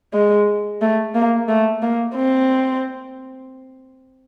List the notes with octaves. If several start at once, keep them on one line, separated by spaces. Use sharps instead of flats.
G#3
A3
A#3
A3
A#3
C4